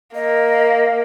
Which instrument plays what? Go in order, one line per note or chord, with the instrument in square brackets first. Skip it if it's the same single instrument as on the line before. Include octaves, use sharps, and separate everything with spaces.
[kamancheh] A#3 [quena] D#5